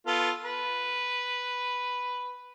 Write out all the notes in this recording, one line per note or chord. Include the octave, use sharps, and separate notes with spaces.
B3 F4 A4
B4